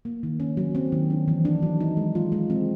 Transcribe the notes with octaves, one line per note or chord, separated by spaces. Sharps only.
A#3
D#3
C#4
F#3
C4
D#3
D4
E3
D4
F#3
D#4
G#3
F4
G#3
C4